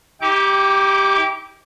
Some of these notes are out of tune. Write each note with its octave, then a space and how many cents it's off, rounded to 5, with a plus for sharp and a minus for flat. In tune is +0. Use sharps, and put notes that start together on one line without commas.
D#4 +45 G4 +0 D6 -25